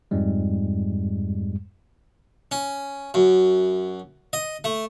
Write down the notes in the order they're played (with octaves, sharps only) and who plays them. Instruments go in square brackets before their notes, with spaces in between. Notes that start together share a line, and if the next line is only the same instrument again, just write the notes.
[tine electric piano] F2 G#2 G3 G#3
[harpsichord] C#4
F#2
D#5
A3